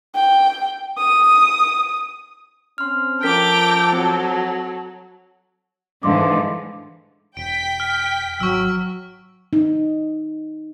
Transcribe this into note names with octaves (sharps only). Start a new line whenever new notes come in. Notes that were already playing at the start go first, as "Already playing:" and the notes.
G5
D#6
C4 C#4 C6 F6
F3 C#4 A4 A#4 G5 A#5 D6 B6
F#3 C4
G#2 D3 E3 F5 C6 D6
E1 G5 B6 D7
F6
G#1 F#3 C#6 E6
D#4